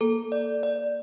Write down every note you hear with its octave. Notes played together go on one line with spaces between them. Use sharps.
A#3 A4
D5
D5